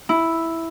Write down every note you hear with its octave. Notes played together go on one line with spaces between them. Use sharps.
E4